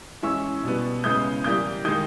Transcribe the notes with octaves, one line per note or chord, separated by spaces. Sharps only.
E3 G#3 C#4 E4 C#6 E6
B2 G3 B3
C#3 G#3 B3 E4 D#6 G6
E3 G3 A#3 D#6 G6
D#3 G#3 D#4 D#6 G6